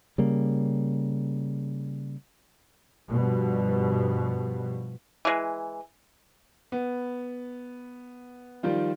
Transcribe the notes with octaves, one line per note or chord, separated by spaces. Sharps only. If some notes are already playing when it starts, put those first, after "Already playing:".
C#3 G3 A#3
G2 B2 F3 G3
E3 G#3
B3
D#3 F3 G3 F4